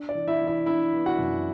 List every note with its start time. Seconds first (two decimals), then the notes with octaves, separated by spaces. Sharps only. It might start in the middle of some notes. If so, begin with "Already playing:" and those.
Already playing: D4
0.09 D5
0.15 E3
0.28 E4 E5
0.41 E3
0.47 E4 E5
0.66 D4 E4 E5
0.93 B3
1.06 F#4 F#5
1.19 F#2